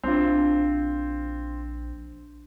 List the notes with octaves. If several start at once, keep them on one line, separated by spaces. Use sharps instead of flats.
A#1 C4 D4 F4